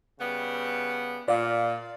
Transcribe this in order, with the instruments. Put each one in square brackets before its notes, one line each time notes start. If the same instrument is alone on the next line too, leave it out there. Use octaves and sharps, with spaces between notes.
[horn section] C#3 G3 B3
[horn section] A#2 [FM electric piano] D5 F5